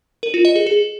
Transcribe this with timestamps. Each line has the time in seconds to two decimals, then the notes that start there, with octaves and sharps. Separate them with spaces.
0.23 A#4
0.34 F4
0.45 D#5
0.56 G#4
0.66 G#4